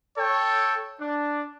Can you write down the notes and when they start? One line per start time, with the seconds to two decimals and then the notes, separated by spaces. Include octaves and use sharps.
0.18 A4 C#5 G5
1.01 D4